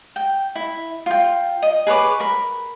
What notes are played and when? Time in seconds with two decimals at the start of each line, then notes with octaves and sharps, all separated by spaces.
0.16 G5
0.55 E4
1.06 F4 G5
1.62 D#5
1.87 G#4 B4 C#5 D6
2.19 A#4 B5